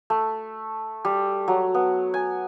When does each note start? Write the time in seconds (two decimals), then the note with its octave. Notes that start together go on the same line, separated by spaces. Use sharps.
0.10 A3
1.05 G3
1.48 F#3
1.74 B3
2.14 G#5